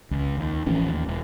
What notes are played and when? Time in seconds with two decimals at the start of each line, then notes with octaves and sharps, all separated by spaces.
0.11 C#2
0.37 D#2
0.66 A1 E3 F3 C#4
0.89 D#2
1.08 E1